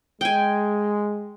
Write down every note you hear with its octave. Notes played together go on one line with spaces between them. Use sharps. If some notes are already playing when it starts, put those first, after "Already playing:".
G#3 G5 G#5